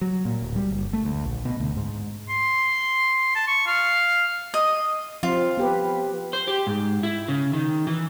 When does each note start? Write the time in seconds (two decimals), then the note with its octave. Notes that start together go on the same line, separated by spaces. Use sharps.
0.01 F#3
0.25 A#2
0.42 D1
0.56 G3
0.71 F#1
0.93 A3
1.05 D2
1.25 A#1
1.45 B2
1.60 D2
1.76 G#2
2.29 C6
3.35 A5
3.48 C#6
3.67 F5
4.54 D#5
5.23 F3 C4 F4
5.57 B3 G4 B4
6.33 C5
6.47 G4
6.67 G#2
7.03 E4
7.28 C#3
7.53 D#3
7.87 E3